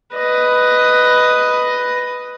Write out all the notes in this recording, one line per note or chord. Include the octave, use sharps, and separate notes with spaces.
B4 D#5